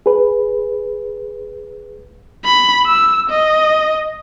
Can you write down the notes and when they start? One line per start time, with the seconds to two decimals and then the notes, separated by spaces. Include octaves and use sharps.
0.06 G#4 B4
2.45 B5
2.86 E6
3.30 D#5